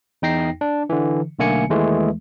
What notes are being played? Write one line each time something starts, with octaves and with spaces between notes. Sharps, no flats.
E2 D#4 G5 A#6 C7
D4
D3 E3
B1 D3 A3 A#3 G#5 C#7
D#2 E3 G#3 A3